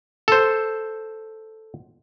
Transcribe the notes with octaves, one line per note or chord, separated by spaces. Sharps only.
A4 C5